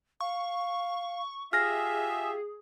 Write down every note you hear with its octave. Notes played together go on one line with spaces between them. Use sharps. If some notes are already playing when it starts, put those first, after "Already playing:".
F5 C#6
F4 G4 G#4 E5 G#5 F6 A#6